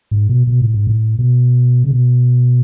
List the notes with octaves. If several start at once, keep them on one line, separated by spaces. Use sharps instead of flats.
G#2
B2
B2
A2
G#2
A2
B2
C#3
B2